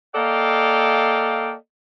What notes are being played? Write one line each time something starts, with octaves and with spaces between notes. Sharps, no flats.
A#3 A4 D5 D#5 F5 G5